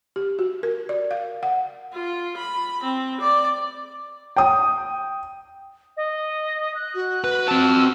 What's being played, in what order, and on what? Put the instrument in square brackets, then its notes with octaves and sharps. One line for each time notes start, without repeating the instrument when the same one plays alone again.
[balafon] G4
F#4
A#4
D5
F5
F#5
[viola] F4
B5
C4
D5
[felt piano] G5 D#6
[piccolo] D#5
F#6
[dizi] F#4
[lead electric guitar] B4
[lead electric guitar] C4 A5 [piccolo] E6